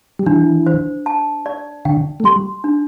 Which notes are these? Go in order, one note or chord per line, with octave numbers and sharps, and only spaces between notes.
G3
E3 D4
C5
A5
D5
D3 G5
A3
G3 C6
D4